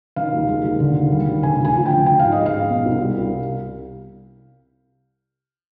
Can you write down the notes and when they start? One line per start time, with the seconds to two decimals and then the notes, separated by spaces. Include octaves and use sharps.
0.16 D#3 F5
0.33 D#2
0.48 G#3
0.64 D#2
0.80 D3
0.96 D#2
1.12 G3
1.27 D#2
1.43 D3 G#5
1.59 D2
1.65 G#5
1.75 F3
1.86 D2 G5
2.06 F3 G5
2.19 G#2 F5
2.32 D#5
2.38 G#3
2.46 F5
2.54 G#2
2.70 B2
2.86 C2
3.01 G3
3.17 C2